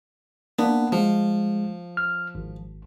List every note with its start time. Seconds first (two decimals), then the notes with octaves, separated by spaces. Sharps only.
0.59 A#3 B3 D4
0.92 F3 G#3
1.97 F6
2.35 G#1